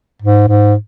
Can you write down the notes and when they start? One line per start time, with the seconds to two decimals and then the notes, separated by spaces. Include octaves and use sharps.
0.22 G#2
0.48 G#2